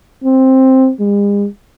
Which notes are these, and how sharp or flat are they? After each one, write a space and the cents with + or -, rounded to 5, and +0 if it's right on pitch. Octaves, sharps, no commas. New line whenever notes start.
C4 +5
G#3 -45